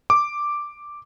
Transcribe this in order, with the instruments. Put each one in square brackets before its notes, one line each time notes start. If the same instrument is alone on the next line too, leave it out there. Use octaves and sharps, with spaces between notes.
[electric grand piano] D6